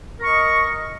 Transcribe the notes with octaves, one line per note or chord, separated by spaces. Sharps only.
A#4 D#5 C#6